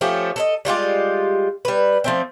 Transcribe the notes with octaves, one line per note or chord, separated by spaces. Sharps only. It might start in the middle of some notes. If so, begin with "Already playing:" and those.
F3 A3 C#4 G4
A4 B4 D#5
G3 G#3 F4 G4
G3 B4
F3 A3 C4